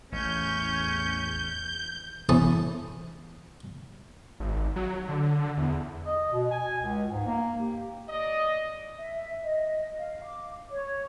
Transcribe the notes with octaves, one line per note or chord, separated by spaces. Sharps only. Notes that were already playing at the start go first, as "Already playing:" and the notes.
A1 E2 C#4 G6
E2 C#4 E4 A5 D#6
G#1
F#3
D3
E2
D#5
B2
G#5
C#2
G#2
A#3
G4
D5 D#5
E5
D#5
F5
D6
C#5